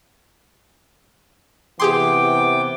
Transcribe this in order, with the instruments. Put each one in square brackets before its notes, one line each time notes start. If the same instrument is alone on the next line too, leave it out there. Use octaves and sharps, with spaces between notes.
[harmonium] C3 B3 [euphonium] E3 [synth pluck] G4 G#4 C6 [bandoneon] G5 D6